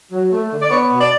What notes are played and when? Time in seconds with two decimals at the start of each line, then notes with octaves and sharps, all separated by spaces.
0.12 F#3
0.32 A3
0.51 D3
0.61 D5
0.71 B3 C#5
0.91 B2
1.00 D5